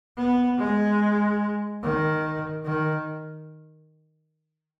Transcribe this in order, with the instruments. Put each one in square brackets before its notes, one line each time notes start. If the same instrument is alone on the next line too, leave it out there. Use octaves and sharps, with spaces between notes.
[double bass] B3
G#3
D#3
D#3